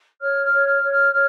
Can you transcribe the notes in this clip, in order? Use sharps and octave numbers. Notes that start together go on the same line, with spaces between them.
C#5 F6
F6
C#5
F6
C#5
F6
C#5 F6